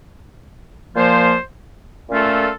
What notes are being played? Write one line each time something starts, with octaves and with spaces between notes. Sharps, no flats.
A#2 F3 A#3 F4 C5
A#2 A3 C#4 F4 A4